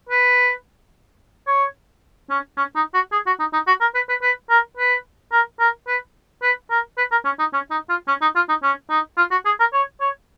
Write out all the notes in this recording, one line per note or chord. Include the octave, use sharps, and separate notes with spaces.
B4
C#5
C#4
C#4
D#4
F#4
G#4
F#4
D#4
D#4
F#4
A#4
B4
B4
B4
A#4
B4
A#4
A#4
B4
B4
A#4
B4
A#4
C#4
D#4
C#4
D#4
F4
C#4
D#4
F4
D#4
C#4
D#4
F4
F#4
G#4
A#4
C#5
C#5